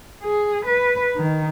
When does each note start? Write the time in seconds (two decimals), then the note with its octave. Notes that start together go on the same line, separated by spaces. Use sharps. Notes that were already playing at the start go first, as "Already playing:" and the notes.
0.23 G#4
0.66 B4
1.16 D#3